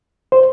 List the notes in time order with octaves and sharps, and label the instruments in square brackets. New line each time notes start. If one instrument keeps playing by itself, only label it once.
[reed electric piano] C5